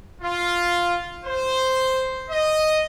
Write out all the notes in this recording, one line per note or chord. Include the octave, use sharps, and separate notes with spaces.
F4
C5
D#5